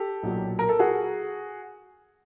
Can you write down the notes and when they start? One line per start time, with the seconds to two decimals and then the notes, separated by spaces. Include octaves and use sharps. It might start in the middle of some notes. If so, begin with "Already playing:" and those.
Already playing: G4 A4
0.23 B1 A#2 F#3
0.59 A#4
0.69 A4
0.79 F#4 G#4